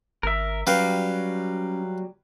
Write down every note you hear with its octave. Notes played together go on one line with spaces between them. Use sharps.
G#1 A#4 E5
F#3 G3 C#4 B4 F5 G5